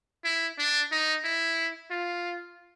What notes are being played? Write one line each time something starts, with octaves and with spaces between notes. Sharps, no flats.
E4
D4
D#4
E4
F4